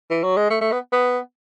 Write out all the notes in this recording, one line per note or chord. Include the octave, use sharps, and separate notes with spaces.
E3
F#3
G#3
A3
A3
B3
B3